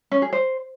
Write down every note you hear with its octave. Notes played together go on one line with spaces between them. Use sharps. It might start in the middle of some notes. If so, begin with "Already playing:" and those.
C#4
G#4
C5